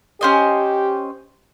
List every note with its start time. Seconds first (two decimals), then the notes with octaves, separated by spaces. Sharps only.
0.21 C#4 G4 C5 D#5